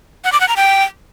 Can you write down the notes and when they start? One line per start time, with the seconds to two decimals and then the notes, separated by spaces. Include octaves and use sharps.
0.24 F#5
0.32 D6
0.40 F#5
0.48 A#5
0.56 G5